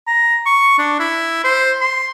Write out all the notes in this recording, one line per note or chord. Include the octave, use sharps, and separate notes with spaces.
A#5
C#6
D4
E4
C5
C6